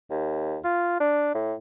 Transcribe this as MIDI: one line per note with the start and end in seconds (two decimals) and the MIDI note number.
0.10 0.58 39
0.64 0.97 65
1.00 1.34 62
1.35 1.55 45